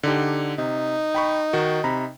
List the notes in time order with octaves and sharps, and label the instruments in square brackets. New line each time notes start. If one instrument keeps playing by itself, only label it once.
[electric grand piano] D3 D#4 G4
[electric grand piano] C3 [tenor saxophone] D#4
[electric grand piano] G5 B5 C#6
D#3 F#4
C3 A#5 B5